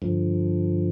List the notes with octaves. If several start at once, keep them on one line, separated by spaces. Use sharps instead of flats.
G2 D3 F3